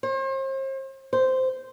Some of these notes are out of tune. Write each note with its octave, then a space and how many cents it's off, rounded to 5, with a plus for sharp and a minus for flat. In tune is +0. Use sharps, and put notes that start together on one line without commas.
C5 +40
C5 -10